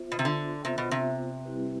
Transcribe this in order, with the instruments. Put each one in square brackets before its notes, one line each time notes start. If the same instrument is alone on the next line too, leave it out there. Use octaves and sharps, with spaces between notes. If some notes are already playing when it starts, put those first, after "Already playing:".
Already playing: [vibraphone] B3 F4 C5 E5
[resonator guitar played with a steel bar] B2
C3
D3
[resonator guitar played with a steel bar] C3 [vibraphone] B3 F4 C5 E5
[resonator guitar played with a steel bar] B2
C3
[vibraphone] G3 C4 E4 G4 B4